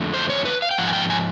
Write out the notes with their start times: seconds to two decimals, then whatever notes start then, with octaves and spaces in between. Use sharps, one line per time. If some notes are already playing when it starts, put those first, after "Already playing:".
Already playing: F2 D3 F3 A3
0.14 C5
0.30 C#5
0.45 B4
0.62 F5
0.71 G5
0.78 G#2 F3 F#5
0.88 G#5
0.93 G5
1.10 G#5